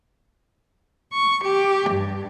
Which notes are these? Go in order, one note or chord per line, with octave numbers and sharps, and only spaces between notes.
C#6
G4
G2